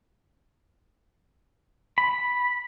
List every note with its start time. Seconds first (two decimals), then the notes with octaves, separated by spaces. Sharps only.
1.98 B5